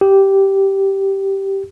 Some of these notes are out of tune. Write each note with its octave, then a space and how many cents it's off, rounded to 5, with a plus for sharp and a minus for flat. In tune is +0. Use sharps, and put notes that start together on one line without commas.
G4 -10